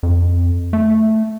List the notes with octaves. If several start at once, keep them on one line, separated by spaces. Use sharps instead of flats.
F2
A3